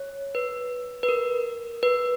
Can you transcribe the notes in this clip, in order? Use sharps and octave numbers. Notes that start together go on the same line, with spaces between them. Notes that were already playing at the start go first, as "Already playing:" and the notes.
Already playing: C#5
B4
B4
A#4
B4